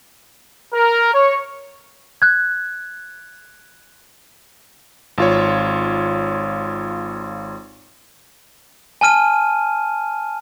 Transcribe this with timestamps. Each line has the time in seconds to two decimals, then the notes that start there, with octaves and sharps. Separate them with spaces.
0.73 A#4
1.14 C#5
2.22 F#6 G#6
5.18 G#1 F4 C#5
9.01 G#5 A5 F6 D#7